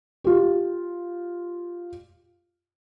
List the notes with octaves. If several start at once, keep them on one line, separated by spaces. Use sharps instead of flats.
F4 G4